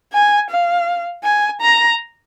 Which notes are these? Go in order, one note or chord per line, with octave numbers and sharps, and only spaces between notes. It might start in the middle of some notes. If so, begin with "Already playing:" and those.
G#5
F5
G#5
A#5